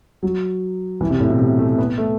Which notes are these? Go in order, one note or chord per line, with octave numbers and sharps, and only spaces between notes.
F#3
E3
C3
A2
B2
C3
A3
B3
A3